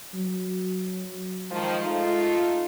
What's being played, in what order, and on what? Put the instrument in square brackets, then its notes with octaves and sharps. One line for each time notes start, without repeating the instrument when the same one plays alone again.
[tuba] F#3
[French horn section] D#3 F3 [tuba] G#3
[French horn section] A3 D#4 F4